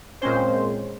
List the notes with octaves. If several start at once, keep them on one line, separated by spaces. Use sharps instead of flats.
A#2 G#3 C4 C#4 C5